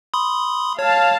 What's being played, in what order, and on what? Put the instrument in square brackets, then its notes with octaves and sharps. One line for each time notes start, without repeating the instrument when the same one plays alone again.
[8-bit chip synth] B5 C6 D#6
[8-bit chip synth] C#5 [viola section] F5 A5